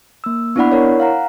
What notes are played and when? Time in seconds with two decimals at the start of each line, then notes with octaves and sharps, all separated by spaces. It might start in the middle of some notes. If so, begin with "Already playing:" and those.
0.24 A#3 E6
0.56 B3 D4 E4 D5 F#5 B5
0.72 E4 A#4 C#5
1.00 F5 F#5 A#5